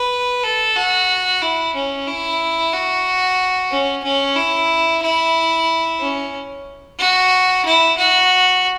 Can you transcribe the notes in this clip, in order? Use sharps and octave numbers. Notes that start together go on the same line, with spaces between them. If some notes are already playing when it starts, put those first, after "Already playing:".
Already playing: B4
A4
F#4
E4
C#4
E4
F#4
C#4
C#4
E4
E4
C#4
F#4
E4
F#4